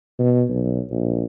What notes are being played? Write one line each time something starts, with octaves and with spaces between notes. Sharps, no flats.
B2
B1
A#1